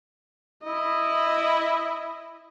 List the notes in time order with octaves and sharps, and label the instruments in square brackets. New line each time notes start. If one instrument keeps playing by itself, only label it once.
[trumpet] E4 [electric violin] D#5